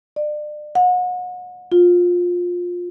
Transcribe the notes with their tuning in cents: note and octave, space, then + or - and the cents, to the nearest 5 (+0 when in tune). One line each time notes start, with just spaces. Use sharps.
D5 +35
F#5 -35
F4 +20